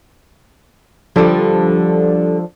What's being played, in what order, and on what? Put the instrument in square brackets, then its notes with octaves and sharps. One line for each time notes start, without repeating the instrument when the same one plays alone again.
[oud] D3 G3 [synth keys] F3 D4 A4